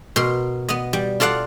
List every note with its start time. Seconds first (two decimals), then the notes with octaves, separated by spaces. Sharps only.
0.16 B2 A#4 C6
0.69 B3 D#5
0.93 G3
1.20 F4 A4 D5 F5 F#5